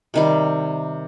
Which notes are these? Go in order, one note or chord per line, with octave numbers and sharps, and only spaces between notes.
C3 D#3 G3